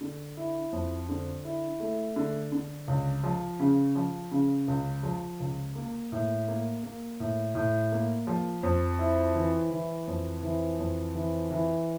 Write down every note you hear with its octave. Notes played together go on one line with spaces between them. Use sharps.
D3
E4
F2
D3
E4
A3
D3
D3
C#2
F3
C#3
F3
C#3
C#2
F3
C#2
A#3
A2
A#3
A#3
A2
A2
A#3
F3
F2
E4
E3
E3
F2
E3
F2
E3
E3